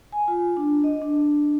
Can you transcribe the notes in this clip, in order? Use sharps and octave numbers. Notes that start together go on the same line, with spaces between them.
G#5
F4
D4
D#5
D4